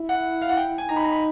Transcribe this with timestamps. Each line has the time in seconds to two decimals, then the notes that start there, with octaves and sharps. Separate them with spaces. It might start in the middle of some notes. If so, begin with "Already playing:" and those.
Already playing: E4
0.09 F#5
0.42 F5
0.49 F#5
0.57 G5
0.78 G#5
0.89 D#4 A#5
0.96 B5
1.04 A#5
1.11 B5